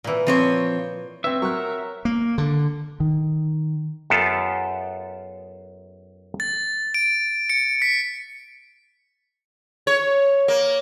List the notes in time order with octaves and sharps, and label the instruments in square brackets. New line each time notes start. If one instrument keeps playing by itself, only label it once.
[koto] A#2 E3
[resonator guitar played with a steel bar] F3 C4 C#5
[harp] C4 C#5 [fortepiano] B4 [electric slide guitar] E5
[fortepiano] F#3 [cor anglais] A#4 [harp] C#6 F#6
[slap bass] A#3
D3
[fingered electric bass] D#3
[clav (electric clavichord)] F#2 B3 F4 G4 A4 A5
[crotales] A6
D7
C#7
B6
[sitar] C#5
A#3